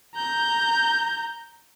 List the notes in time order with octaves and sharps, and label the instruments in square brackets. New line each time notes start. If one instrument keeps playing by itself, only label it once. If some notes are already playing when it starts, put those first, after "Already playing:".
[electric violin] A#5 G6